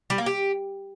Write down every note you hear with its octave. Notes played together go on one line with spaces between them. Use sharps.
G3
A#3
G4